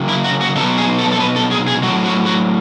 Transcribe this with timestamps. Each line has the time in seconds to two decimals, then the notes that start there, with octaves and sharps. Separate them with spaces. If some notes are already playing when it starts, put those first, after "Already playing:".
Already playing: C#3 F#3
0.09 E4
0.24 F#4
0.41 F#4
0.56 B2 F#3 A4
0.78 G#4
0.98 A4
1.12 A4
1.20 B4
1.36 A4
1.51 G#4
1.68 G#4
1.83 A2 F#3 F#4
2.05 F#4
2.26 F#4